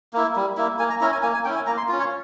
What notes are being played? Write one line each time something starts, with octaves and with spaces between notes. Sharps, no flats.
A#3 E4
G3
A#3 E4
A#3 G#5
A#5
C#4 E4 A#5
G#5
A#3 G#5
G#5
C#4 E4 G5
G#5
A#3 A#5
C6
C#4 F4
C#5